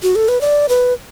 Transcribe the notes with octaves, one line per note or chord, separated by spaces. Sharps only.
F#4
A4
B4
D5
B4